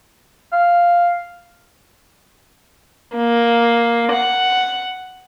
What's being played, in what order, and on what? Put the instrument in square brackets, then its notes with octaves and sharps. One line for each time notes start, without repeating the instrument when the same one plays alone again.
[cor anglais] F5
[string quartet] A#3
F#5